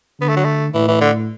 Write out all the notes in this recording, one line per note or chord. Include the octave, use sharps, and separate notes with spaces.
D3 B3
A3
F#3
A3
A2 E3
E3
D3